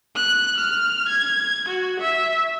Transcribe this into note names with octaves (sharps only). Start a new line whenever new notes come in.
F#6
F6
G#6
F#4
E5